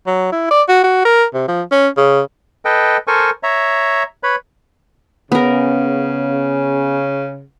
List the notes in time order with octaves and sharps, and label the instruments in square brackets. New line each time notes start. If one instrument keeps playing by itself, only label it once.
[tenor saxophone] F#3
E4
D5
F#4
F#4
A#4
C3
F3
C#4
C#3
[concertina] A4 B4 D#5 G5
A4 A#4 C5 G#5 C#6
C#5 E5 A#5
B4 C#5 B5
[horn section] C#3 [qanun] B3 A#4